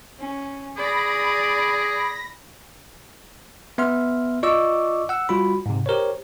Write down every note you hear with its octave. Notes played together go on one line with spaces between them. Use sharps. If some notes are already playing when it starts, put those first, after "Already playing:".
C#4
G#4 D5 B5 A#6
B3 E5 C6 F6
F4 D5 D#5 C#6 D6 E6
F#5 E6
G3 F4 F#4 B5
G#2 C3
G4 A#4 C5 C#5